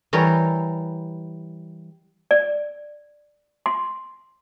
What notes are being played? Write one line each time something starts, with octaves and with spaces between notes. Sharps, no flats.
E3 G3 A#4 C#5
D5
C6